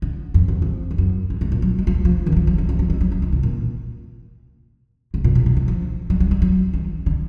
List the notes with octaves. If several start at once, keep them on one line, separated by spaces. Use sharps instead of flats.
D3
F2
F#2
F2
F2
F#2
F#2
G#2
A#2
F#3
G#3
F3
F#3
F3
D3
D#3
F#3
F3
F3
D#3
F3
F#3
G#3
F#3
F3
D#3
B2
A#2
G#2
A#2
B2
D3
D#3
F3
F#3
F#3
G#3
F#3
D#3
D3